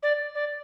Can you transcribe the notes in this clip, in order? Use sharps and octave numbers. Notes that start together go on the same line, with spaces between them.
D5
D5